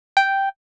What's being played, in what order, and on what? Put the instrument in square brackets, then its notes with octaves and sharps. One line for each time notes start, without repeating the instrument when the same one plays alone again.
[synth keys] G5